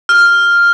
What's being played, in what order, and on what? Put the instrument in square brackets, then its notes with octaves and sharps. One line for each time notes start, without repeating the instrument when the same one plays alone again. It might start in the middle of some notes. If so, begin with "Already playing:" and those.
[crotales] F6